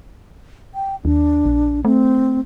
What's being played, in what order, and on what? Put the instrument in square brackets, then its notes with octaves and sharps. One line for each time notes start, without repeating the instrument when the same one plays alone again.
[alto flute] G5
[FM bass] D#2 [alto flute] D4
[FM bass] A#1
[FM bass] A3 [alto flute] C4